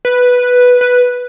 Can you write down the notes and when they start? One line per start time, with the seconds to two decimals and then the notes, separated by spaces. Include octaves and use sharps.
0.05 B4
0.81 B4